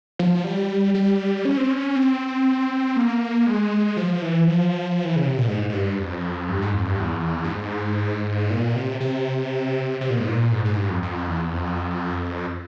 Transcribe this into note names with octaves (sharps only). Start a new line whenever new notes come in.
F3
G3
G3
C#4
C4
C#4
C4
A#3
G#3
F3
E3
F3
E3
C#3
C3
A#2
G#2
G#2
G2
F2
G2
G#2
F2
G2
E2
G2
G#2
A#2
C3
C3
C3
A#2
G#2
A#2
G#2
G#2
G2
F2
F2
E2
F2